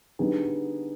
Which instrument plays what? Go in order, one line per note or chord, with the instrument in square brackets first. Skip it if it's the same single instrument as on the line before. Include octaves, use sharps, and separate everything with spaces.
[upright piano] D3 G3 B3 D#4 G#4